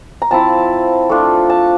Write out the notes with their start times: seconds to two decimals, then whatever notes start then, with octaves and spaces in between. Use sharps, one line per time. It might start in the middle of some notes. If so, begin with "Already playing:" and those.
0.22 A#5
0.31 F3 C4 E4 A5
1.10 A3 D4 F4
1.50 A5